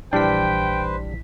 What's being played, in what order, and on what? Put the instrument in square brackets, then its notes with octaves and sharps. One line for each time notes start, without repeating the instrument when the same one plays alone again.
[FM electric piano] A#1 E3 B6 [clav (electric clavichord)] G3 D4 [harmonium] B4 C5 [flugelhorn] G5